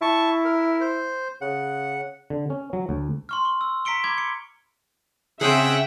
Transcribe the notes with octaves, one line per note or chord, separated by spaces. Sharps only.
E4 A5 C#6
A#4
C5
C#3 F#5
D3
C#4
F#3
D2
C6 C#6 F6
C#6
E6
A#5 B6 C#7 D7 G7
B5 D6 G#6
C#7
C#3 C4 C#4 G#4 E5 F#5 G5